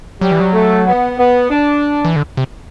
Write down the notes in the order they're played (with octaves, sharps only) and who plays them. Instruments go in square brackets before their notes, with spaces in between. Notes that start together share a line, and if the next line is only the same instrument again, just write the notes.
[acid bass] F#3 [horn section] G3
[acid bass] E3
F#3
[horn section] A3
B3
B3
D4
[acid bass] E3
D3
C3